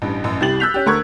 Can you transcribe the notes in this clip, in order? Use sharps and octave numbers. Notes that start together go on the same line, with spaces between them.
A1 G2
A1 F#2
C2 G3 E4 G4 A6 F#7
E6 F#6 G6 B6 F7
C#4 G4
D2 A3 A#4 C#6 F#6 G#6